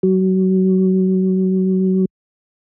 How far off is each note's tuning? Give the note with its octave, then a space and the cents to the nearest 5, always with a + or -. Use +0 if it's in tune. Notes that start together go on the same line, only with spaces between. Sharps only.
F#3 +25